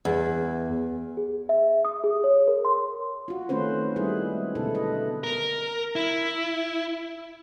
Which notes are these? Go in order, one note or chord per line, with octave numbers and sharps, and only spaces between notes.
E2
G#4
E5
D#6
G#4
C#5
A#4
C6
F4 F#4
D#3 A3 C4 C#4 B4 C5
G3 G#3 E4 G#4 B4
B2 D3 E4 A4
B4 D#5
A#4
E4